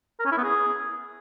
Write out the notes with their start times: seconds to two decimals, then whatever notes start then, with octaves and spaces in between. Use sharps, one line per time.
0.19 A#4
0.26 C#4
0.32 E4
0.38 B3
0.44 G#4